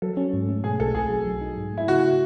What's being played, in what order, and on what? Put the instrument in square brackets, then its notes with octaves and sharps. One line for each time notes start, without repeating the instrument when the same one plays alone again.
[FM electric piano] F#3 [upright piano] A4
[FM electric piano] C#4
G#2
A3
[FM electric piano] B2 [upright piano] G#4
[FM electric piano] B1 [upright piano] A4
[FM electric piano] B1 [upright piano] G#4
[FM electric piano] F#3
F#3
D#4
G#2
[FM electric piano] A3 [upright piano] E4
[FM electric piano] C#3 [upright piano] F#4